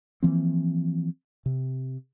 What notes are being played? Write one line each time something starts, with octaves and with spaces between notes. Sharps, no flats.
E3 F3 A#3 C4
C3